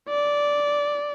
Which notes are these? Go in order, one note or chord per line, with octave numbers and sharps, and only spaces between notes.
D5